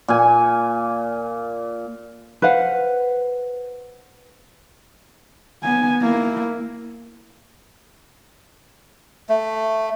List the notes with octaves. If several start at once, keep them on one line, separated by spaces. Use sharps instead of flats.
A#2 G#5
B4 C5 F5 F#5
B3 G#5
A#3 E4
A3